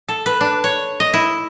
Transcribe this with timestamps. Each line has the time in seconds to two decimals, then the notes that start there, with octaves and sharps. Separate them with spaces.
0.08 A4
0.26 B4
0.41 D4
0.64 C#5
1.00 D#5
1.14 E4